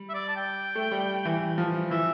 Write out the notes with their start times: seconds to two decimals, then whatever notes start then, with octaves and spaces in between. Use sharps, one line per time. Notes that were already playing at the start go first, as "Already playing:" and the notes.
Already playing: G3
0.09 E5
0.14 D5
0.28 A5
0.36 G5
0.75 A3
0.91 G3
1.25 E3
1.58 F3
1.91 E3 E5